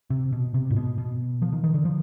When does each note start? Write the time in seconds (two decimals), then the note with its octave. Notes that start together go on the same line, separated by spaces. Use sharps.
0.10 C3
0.32 B2
0.54 C3
0.70 G#2
0.76 B2
0.98 B2
1.42 F3
1.52 D#3
1.64 D#3
1.74 D3
1.85 F3